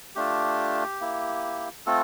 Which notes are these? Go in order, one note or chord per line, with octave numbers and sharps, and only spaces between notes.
A3 D4 F4 G4
A#3 E4
A3 C4 F4 A4